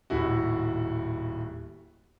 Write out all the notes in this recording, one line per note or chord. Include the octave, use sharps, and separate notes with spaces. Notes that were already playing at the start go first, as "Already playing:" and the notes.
D#1 A2 E4 F#4